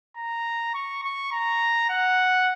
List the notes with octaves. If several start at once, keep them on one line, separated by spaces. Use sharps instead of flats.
A#5
C#6
C#6
A#5
F#5